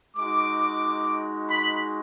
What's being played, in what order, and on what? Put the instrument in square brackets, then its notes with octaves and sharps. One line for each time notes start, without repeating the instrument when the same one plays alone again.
[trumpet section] G#3 D#4 F#4 D6
B5